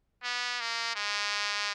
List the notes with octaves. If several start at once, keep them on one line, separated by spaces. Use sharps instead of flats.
B3
A#3
G#3